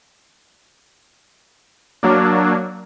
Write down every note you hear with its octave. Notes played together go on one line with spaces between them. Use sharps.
F#3 A#3 D4